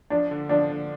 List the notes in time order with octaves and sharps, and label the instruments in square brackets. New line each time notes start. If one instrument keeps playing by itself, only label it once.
[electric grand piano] F3 [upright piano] D4
[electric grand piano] D3
[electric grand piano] F3 [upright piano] D4
[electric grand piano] D3